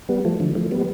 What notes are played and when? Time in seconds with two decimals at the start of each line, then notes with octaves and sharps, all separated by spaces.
0.09 G3 B3
0.25 F3 A3
0.40 D3 F3
0.55 F3 A3
0.71 G3 B3